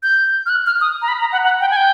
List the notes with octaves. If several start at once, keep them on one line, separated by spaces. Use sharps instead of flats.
G6
F6
F#6
F6
D#6
A#5
B5
A#5
F#5
F#5
G5
G#5
G5